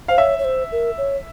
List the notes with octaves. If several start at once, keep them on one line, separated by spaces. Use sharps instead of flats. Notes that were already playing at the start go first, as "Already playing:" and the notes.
C5 F5
C#5 E5
C#5
C5
A#4
C#5